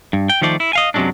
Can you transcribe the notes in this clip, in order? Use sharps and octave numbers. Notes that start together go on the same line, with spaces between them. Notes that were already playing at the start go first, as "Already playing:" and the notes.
G2
G5
D#3 F3 A3 C5 D5
E4
D#5 F5 G#5
F#2 C3 F3 F#3 G#3 D4